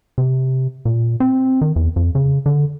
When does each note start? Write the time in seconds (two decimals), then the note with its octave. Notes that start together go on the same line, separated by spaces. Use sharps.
0.18 C3
0.85 A#2
1.20 C4
1.61 D#3
1.76 E2
1.96 F2
2.15 C#3
2.46 D3